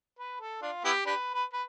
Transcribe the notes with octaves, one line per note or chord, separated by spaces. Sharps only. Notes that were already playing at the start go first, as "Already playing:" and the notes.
B4
A4
D4 F4
B3 E4 G4
D4 G4 B4
B4
B4